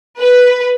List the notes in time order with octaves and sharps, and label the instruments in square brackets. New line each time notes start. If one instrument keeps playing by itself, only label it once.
[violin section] B4